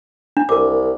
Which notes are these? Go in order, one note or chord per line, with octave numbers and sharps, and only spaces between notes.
D4
C2 A#4 D6